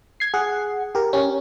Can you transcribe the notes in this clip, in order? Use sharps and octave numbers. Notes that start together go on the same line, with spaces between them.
G#6 C7
G#4 F#5
G4 A#4
C#4 G4